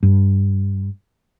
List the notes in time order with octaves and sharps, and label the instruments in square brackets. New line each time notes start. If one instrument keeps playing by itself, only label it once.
[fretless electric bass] G2